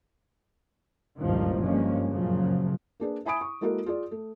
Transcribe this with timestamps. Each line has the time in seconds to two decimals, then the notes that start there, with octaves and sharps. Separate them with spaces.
1.20 F#1 C#2 G2 A#2 D#3 F3
1.64 G2 F3 G#3 A#3 C#4
2.10 F#2 A#2 C#3 F3 F#3
3.00 A#3 D4 G#4 B4
3.25 E5 G#5 B5 D#6 D7
3.41 C#6
3.61 G#3 A#3 E4 F#4 A4 A#4
3.86 F4 G#4 D5
4.11 A3